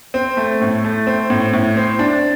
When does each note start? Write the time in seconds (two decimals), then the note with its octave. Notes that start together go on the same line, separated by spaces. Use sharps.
0.14 C4
0.37 A3
0.61 A2
0.84 A3
1.07 C4
1.30 A2
1.53 A2
1.77 C4
1.99 D4